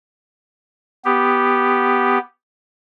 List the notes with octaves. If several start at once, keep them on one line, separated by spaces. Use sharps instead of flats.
B3 G4